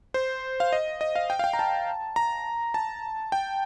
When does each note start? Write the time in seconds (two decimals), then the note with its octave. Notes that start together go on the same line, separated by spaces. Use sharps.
0.14 C5
0.60 F5
0.73 D#5
1.01 D#5
1.16 F5
1.30 G5
1.39 F5
1.44 G5
1.53 A#5
1.59 A5
2.16 A#5
2.74 A5
3.32 G5